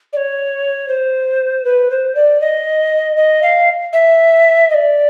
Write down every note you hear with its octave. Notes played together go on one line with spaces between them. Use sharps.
D5
C#5
C5
B4
C5
D5
D#5
D#5
F5
E5
D#5
D5